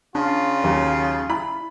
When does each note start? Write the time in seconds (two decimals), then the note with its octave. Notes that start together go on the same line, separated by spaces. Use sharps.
0.15 C#3 D4 F4
0.64 D#2 F#3
1.30 E4 B5